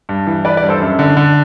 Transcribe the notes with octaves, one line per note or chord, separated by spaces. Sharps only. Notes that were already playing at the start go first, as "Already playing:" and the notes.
G2
E3
E3 B4 D5
B4 D5
G2
A4 C5
F#2
D3
D3